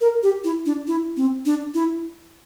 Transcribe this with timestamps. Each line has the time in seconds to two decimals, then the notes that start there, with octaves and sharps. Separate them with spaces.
0.01 A#4
0.23 G4
0.44 E4
0.66 D4
0.87 E4
1.17 C4
1.45 D4
1.74 E4